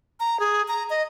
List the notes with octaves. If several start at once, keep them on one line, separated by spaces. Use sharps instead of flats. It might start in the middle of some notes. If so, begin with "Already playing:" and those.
A#5
G#4
A#5
D#5